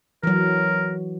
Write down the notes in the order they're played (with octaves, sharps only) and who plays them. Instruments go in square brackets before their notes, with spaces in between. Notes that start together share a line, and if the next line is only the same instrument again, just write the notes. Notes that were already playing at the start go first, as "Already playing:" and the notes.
[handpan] E3 F#3 [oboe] A#4